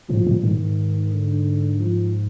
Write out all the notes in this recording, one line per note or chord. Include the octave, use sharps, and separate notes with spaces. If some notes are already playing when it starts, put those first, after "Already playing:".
G#2 F3
A#2
G#2 D#3
D3
F3